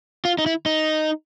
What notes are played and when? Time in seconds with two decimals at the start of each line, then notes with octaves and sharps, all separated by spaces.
0.25 F4
0.39 D#4
0.46 E4
0.66 D#4